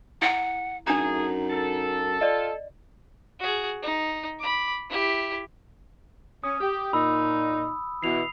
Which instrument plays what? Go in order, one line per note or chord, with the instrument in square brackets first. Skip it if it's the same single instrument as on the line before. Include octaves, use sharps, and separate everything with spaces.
[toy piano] E4 [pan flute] F#5
[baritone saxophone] F#2 [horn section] A3 G#4 [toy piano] D4 A#5 [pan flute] D#4
[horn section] A4
[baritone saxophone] F4 [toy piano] D5 D#5
[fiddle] F#4 G#4
D#4
B5 D6
E4 G4
[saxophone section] C#4 [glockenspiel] D#6
[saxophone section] G4
[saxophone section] A#2 D#4 [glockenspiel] B5 E6
[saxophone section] B2 E3 [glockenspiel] C7 F7